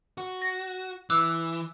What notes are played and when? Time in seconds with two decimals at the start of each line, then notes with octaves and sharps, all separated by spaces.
0.18 F#4
0.42 A#6
1.10 E3 D6 E6 F#6